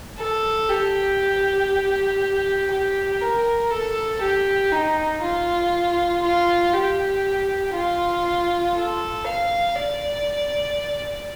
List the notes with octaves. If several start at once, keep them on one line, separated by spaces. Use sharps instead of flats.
A4
G4
G4
A#4
A4
G4
D#4
F4
F4
G4
F4
A4
F5
D5